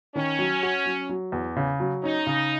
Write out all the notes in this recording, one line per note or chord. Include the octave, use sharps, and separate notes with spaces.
D#3 C#4
F#3
F#4
F#3
F#3
E2
C#3
F#3
C#4 D#4
C#3